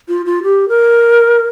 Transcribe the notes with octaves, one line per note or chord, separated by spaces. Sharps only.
F4
F4
G4
A#4